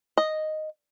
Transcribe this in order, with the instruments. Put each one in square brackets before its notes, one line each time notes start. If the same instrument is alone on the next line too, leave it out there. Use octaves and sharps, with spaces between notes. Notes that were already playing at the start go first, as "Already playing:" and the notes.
[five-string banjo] D#5